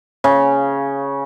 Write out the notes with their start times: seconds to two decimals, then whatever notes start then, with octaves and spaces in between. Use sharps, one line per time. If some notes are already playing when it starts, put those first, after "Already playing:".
0.24 C#3